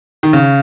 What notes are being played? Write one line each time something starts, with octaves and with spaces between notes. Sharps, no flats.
D#3
C#3